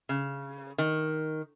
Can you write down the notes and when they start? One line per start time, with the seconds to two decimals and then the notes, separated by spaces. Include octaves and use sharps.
0.09 C#3
0.78 D#3